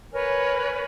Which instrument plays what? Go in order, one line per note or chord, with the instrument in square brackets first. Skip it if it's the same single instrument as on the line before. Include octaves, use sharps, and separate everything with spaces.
[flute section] A#4 B4 C#5 G#5